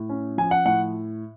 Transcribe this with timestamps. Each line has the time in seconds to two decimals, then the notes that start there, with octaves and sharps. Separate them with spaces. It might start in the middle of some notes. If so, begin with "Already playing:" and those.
Already playing: A2
0.09 C#4
0.38 F3 G#5
0.51 F#5
0.65 A2 F#5